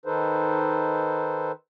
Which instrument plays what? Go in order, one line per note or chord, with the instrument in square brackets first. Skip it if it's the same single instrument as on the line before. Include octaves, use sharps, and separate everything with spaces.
[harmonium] D#3 D#4 A4 B4 C5